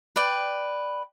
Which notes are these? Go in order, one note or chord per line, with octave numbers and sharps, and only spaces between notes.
B4 D5 G5